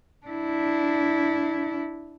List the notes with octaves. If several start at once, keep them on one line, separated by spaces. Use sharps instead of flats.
D4 E4